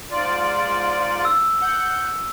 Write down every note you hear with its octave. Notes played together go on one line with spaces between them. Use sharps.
G#2 F4 D5
E6
F#5 G6